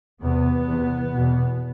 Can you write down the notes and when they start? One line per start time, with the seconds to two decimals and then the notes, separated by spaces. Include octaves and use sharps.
0.22 E2 C3 B3
0.67 E2 C3
1.13 E2 B2